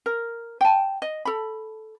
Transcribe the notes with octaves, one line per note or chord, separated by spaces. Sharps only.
A#4
G5 A5
D#5
A4 B5